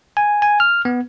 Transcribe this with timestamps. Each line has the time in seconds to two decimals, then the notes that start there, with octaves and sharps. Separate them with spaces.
0.17 G#5
0.42 G#5
0.60 F6
0.85 B3